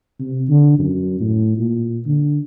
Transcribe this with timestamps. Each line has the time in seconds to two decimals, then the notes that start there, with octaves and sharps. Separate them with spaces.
0.20 C3
0.49 D3
0.79 F#2
1.20 A2
1.58 A#2
2.06 D3